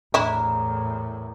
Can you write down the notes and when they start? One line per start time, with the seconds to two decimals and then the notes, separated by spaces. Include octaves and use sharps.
0.14 E2 A2 D4 E4 A#4